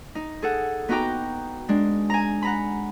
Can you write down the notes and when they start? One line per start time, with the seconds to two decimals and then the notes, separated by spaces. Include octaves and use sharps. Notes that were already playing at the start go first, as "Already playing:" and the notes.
0.15 D#4
0.42 G#4 A4 F#5
0.89 B3 D#4 F#4 G5 A#5 D6
1.69 G#3 D4
2.10 G#5 A#5
2.43 F#5 A#5 B5